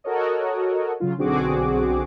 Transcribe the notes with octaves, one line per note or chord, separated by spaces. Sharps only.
F#4 A4 A#4 C#5 D#5
C#3 F#3 F4
B1 D3 C4 F#4 G#4 D6